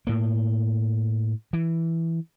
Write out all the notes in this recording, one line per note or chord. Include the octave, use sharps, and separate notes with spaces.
A2 A#3
E3